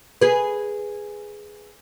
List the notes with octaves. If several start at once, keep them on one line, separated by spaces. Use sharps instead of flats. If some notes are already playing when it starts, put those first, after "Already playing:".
G#4 B4